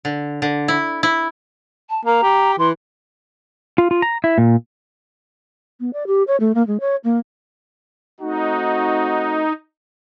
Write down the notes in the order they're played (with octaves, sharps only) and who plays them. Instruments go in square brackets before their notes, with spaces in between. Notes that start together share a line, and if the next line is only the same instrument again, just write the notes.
[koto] D3
D3
E4
E4
[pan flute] A5
[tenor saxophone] A#3 [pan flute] A#5
[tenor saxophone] G4
[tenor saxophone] E3 [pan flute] C6
[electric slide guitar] F4
F4
A#5
E4
A#2
[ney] B3
D5
G4
C#5
A3
A#3
G#3
C#5
A#3
[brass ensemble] A3 C4 F#4 [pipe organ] D#4